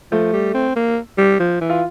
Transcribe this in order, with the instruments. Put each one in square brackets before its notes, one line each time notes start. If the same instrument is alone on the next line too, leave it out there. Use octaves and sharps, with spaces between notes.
[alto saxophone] F3 [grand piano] A3
[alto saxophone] G3
C4
A#3
G3
F3
E3
[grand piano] F4